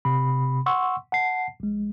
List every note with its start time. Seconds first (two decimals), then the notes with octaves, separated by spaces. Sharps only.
0.05 C3 B5
0.66 F#5 C6 C#6 E6
1.12 F#5 A5 C7
1.60 A#1 G#3